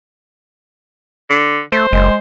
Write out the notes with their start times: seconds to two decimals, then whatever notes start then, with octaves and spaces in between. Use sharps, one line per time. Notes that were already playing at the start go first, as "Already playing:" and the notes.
1.30 D3
1.72 A3 C5
1.93 F#1 G#3